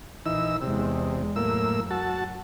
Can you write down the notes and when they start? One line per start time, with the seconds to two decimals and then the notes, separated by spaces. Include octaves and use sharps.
0.26 A#1 E3 D#4 E6
0.62 E2 C3 G#3
1.36 F#2 A2 A#3 E6
1.90 F#4 A5